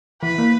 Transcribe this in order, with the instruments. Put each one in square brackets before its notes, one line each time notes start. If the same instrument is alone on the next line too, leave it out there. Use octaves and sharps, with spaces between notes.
[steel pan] E3 [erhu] B4
[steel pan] A#3